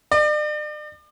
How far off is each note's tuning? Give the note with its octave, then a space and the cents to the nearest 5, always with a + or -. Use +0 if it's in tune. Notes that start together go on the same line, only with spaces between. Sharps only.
D5 +40